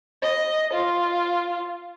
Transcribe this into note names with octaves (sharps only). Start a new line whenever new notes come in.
D#5
F4